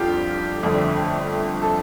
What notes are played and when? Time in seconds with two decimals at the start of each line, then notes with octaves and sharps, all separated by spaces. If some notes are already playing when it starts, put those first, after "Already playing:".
Already playing: F1 F2 D3 G3 F4 G4
0.62 G1 F2 D3 A3
1.62 A4